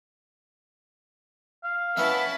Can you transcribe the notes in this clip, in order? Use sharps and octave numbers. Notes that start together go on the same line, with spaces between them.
F5
B3 C#4 E4 E5 A5